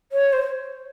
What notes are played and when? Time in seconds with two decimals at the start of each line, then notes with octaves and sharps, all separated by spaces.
0.12 C#5
0.33 C5